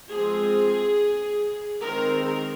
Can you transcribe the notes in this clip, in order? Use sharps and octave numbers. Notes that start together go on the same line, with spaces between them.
F3 G#3 C4 G#4
D#3 G#3 C4 A#4
A#4